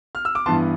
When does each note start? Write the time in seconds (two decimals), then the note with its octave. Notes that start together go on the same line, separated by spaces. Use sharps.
0.15 F6
0.25 E6
0.35 D6
0.46 G2 E3 B3 A5 C6